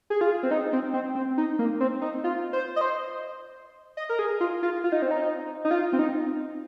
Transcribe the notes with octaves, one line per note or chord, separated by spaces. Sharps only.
G#4
F4
C4
D#4
C4
C4
C4
D#4
A#3
C4
D#4
F4
C5
D#5
C5
D#5
A#4
G#4
F4
F4
F4
D#4
C4
D#4
D#4
F4
C4
D#4